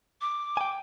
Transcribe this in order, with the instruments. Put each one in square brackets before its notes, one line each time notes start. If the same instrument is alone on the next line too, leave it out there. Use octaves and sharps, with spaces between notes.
[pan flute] D6
[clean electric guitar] G5 G#5